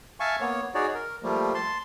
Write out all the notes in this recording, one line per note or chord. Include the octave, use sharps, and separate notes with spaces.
E5 F5 G#5 A5 C#6
A#3 B3 C#5
D#4 F#4 G#4 C#5 D5
A#4
F3 G3 A3 A#3
A5 C6